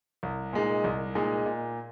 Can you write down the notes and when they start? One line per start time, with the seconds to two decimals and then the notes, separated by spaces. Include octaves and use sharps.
0.23 C2
0.53 A#2 G#3 D#4
0.84 C2
1.15 A#2 G#3 D#4
1.46 A#2